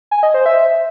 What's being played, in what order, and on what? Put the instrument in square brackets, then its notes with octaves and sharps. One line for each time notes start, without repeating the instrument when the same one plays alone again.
[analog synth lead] G#5
D#5
C5
E5